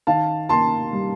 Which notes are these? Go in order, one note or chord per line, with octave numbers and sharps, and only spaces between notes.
D#3 F5 A5
A#3 A5 C6
G3